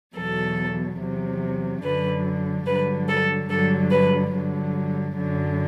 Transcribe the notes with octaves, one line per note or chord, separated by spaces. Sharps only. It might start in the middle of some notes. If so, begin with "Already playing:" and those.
E2 B2 F#3 A4
E2 C3 F#3
F#2 D3 F#3 B4
G2 D3 F#3 B4
A4
G2 D3 F#3 A4
B4
G2 D3 F#3
F#2 D3 F#3